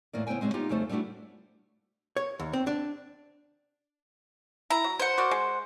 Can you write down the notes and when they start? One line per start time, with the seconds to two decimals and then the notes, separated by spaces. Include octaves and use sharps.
0.13 E2 A2 A#3 D5
0.27 C#3 B3 E4 C5 G5 G#5
0.41 C#3 E3 G3 G#3 C4
0.54 B3 D#4 F4 G4
0.69 F2 C#3 G3 A3 C5
0.89 G3 A3 B3 D4 E4 F#4
2.17 C#5
2.40 D#2
2.53 C4
2.67 D4
4.71 E4 A#5
4.84 F#3
4.99 C5 F#5
5.18 F#4 A#4 D5
5.31 G#3